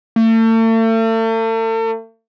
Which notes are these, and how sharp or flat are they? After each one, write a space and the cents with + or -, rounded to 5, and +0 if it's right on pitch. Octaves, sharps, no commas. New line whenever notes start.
A3 +40